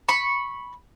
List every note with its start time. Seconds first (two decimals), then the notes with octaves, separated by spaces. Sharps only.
0.09 B5 C#6